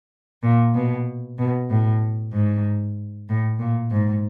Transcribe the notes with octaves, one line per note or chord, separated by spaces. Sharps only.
A#2
B2
B2
A2
G#2
A2
A#2
G#2